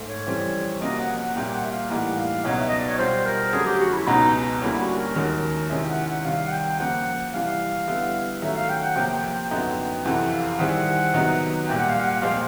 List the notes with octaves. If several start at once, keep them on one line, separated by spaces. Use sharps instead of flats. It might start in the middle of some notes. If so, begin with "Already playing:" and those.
Already playing: G#2 A3
C#5
F2 C#3 E3 G3 C4
C3 F3 A#3 C#4 F#4 D#5
F#5
F#5
C2 A#2 G3 A#3 G5
F#5
E5
F5
A2 E3 G3 A#3 D#4 F#5
F5
C#2 B2 F#3 B3 D#4 C#5
E5
D#5
D5
C#5
B2 G3 C4 F4 C5
A#4
F2 D3 F#3 A3 C#4 G#4
G4
F#4
E4
C#2 B2 G#3 B3 D#4
D2 D3 G3 A#3 C#4 E4
F#4
A#4
D#2 D#3 G#3 C#4 F#4 A#4
C3 D#3 G#3 C#4 E4
G5
F#5
F#5
C3 D#3 G3 F5
F#5
G5
C#3 F3 A#3 F#5
C3 E3 G3 F5
D3 G3 B3 E4
D#3 F#3 A3 C#4 E5
F5
G5
F#5
C3 F3 A#3 G5
G5
G5
F#2 D3 F#3 B3 D#4
G5
F2 C3 E3 F#5
F5
D#3 G3 C4 E4 G#4 F#5
C3 D#3 F#3 B3 D#4
C2 A#2 G3 G5
F#5
F5
F#5
A#2 F3 G#3 C4 F5